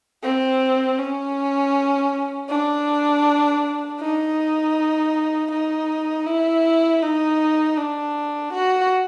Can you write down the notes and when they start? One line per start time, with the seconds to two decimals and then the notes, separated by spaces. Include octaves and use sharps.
0.23 C4
0.99 C#4
2.50 D4
4.01 D#4
5.51 D#4
6.27 E4
7.03 D#4
7.78 D4
8.53 F#4